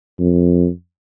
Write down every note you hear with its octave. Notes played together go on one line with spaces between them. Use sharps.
F2